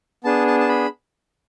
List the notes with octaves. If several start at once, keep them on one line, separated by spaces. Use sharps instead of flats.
B3 D4 G#4 A5
A5
A5
B5